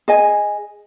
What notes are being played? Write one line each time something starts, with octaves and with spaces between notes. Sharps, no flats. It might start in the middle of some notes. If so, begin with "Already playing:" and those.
G#4 D#5 G#5